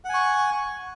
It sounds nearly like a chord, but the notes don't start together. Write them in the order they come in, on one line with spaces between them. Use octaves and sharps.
F#5 G#5 C#6